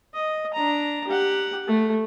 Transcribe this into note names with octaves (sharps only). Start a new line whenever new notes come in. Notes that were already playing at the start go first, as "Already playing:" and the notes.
D#5
D4 A#5
G4 F#5
A3